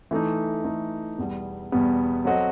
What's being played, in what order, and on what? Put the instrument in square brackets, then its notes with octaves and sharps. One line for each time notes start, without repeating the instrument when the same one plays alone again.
[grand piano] E3 A3 D#4
E3 A3 D#4
E2 B2 G3 B3
E2 B2 G3 B3
F#3 C4 F#4 A4 D#5